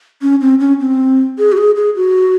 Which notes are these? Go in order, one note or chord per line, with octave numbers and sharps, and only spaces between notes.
C#4
C4
C#4
C4
G#4
F#4
G#4
G#4
F#4